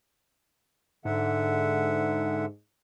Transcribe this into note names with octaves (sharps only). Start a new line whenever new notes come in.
G#2 D3 E5 F#5